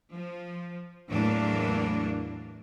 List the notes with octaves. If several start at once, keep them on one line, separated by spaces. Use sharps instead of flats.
F3
E2 A2 E3 F#3 A#3 D4